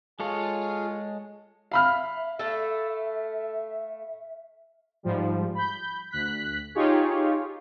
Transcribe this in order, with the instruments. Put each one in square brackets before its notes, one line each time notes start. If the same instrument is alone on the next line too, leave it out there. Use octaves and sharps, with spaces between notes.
[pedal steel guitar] G#3 A4 C#5 [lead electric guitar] F4 F5 [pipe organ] G#4
[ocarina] E5 [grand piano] F5 B5 F6
[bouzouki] A3 A4
[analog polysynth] G#2 F3 G3
B5 G6
D2 F#6 B6
D#4 F4 G4 G#4 C#5